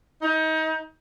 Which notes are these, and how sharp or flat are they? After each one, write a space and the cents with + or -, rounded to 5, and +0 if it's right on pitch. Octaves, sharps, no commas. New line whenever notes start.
D#4 +30